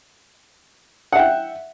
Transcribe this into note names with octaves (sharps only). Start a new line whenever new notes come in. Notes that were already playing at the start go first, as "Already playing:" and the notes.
E5 F#5 G5